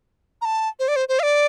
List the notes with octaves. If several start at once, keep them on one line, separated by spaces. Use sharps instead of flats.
A#5
A5
C5
D5
C5
C5
F5
D5